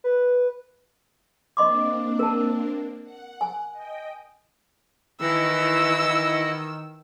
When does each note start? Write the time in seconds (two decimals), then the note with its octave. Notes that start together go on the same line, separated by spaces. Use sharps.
0.04 B4
1.57 A#3 C4 D4 D#5 C6 D6
2.19 A#4 A5
3.04 F#5
3.41 G#5
3.72 D#5 G5
5.21 D#3 E3 E4 D#5 F#5 E6